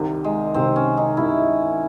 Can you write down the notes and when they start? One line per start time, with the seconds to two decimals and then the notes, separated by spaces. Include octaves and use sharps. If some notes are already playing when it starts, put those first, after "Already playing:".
Already playing: C2 C3 D#3
0.24 G#3
0.54 C2 C3 D#3 C4
0.76 C#4
0.97 D#4
1.17 C2 C3 D#3 E4